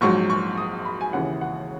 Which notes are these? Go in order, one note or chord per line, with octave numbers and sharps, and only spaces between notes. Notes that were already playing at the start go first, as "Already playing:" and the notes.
A#1 G#2 F#3 C#6
C#6
D#6
B5
G#5
D#2 C#3 E3 F#5
F#5